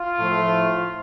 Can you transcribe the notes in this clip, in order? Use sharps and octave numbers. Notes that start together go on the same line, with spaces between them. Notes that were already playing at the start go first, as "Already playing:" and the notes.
Already playing: F4
A2 F3 A3